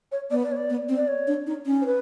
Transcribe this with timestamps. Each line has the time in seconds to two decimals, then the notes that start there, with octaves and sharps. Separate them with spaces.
0.12 C#5
0.31 B3 D5
0.44 D5
0.52 C#5
0.57 D5
0.70 B3
0.89 C4
0.97 D5
1.08 C#5
1.27 D4
1.47 D#4
1.66 C#4
1.82 C5
1.86 B4